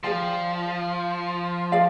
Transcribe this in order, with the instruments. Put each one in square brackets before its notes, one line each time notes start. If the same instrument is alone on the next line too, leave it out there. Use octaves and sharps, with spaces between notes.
[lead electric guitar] F3 [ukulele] G#4 D5 G5
[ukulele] G#4 D5 F5